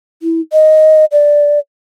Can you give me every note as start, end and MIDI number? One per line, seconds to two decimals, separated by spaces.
0.23 0.41 64
0.53 1.05 75
1.12 1.59 74